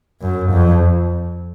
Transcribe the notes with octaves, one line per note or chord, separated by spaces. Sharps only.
F#2
F2